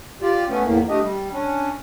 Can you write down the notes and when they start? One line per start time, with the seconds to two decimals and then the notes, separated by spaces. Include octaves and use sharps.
0.22 F4 G4 D5
0.49 A3 B3 C#4
0.64 E2 A2 A#3
0.89 A3 D4 G4 D#5
1.02 G3
1.32 C#4 D4